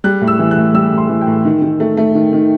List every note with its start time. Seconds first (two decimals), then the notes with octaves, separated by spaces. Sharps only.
0.04 G3 F#6
0.22 A2
0.28 E6
0.39 E3
0.51 F#6
0.57 A2
0.74 G3 E6
0.92 A2
0.98 C6
1.09 E3
1.21 G5
1.27 A2
1.45 D#3
1.62 D#3
1.80 A3
1.97 A3
2.15 D#3
2.33 D#3